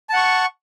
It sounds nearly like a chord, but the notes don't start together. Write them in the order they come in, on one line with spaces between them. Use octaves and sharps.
A5 F#5 C#6